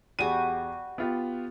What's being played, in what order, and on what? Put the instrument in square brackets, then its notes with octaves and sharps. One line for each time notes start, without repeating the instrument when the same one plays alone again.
[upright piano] E2 G#4 D#7 [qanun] G3 F#4
[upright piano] B3 F4 G4